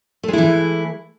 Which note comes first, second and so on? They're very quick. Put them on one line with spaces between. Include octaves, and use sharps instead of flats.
A3 G#3 E4 E3